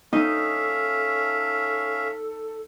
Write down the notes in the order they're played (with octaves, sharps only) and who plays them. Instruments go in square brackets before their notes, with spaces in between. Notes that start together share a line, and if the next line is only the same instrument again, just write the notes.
[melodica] C#4 E5 F5 [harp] D#4 [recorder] A4